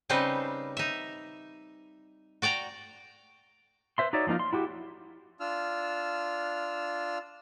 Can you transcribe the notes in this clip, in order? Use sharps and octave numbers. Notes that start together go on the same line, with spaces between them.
C#3 G3 C4 D#4 B4 C5
D#4 E5
F#4 D5 G5 A#5
B4 C5 E5 C6
D#4 F#4 C#5 D5 E5
F3 F#3 A#3 D#4 F4
C6
E4 F#4 G4
D4 F4 E6 F6